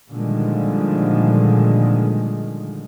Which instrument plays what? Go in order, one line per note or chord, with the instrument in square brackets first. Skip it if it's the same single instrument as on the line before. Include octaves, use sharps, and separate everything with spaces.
[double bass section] A#2 D3 D#3 F3 G3 G#3